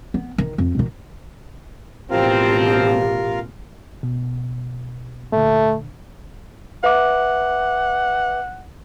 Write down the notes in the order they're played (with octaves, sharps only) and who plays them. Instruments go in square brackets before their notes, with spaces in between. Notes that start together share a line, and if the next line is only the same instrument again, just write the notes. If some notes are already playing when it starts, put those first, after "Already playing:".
[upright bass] B3
D#3
F2
B2 D#3
[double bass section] A1 B2 [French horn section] F3 C4 [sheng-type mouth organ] F4 A#4 F5 [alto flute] G4
[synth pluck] B2
[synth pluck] A#2 D3 [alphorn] A3
[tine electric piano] B4 E5 D6 [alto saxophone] F#5